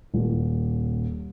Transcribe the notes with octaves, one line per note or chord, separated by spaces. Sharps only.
D#1